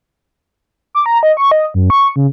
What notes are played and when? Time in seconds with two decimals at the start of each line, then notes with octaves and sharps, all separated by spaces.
0.95 D6
1.06 A#5
1.23 D#5
1.37 C#6
1.51 D#5
1.74 F#2
1.90 C#6
2.16 C#3